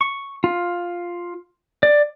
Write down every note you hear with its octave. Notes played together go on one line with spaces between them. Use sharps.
C#6
F4
D5